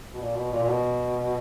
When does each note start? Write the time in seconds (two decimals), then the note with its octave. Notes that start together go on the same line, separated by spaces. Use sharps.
0.14 B2
0.21 A#2
0.36 B2
0.52 A#2
0.62 A#2
0.68 B2